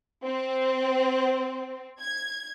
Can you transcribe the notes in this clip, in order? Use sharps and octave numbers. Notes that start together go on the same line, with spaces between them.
C4
G#6